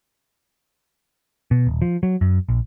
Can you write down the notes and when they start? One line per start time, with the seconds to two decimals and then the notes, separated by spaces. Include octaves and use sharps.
1.51 B2
1.67 D#1
1.82 F3
2.03 F#3
2.21 F#2
2.49 A#1